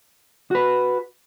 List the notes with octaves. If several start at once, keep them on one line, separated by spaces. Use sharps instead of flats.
F#4 B4